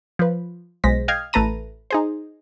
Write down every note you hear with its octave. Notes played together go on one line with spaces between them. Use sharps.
F3 B4
B1 G#3 C5 A#6 B6
D#5 F5 G5 F6 G#6
A1 A3 B4 A5 A#5 D#7
D#4 G#4 C5